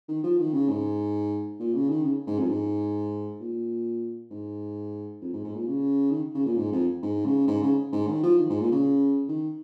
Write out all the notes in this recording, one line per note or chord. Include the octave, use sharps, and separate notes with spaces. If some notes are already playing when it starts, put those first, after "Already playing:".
D#3
F3
D#3
C#3
G#2
A#2
C#3
D#3
C#3
G#2
F2
G#2
A#2
G#2
F2
G#2
G#2
A#2
C#3
D#3
C#3
A#2
G#2
F2
G#2
C#3
G#2
C#3
G#2
D#3
F3
D#3
G#2
A#2
C#3
D#3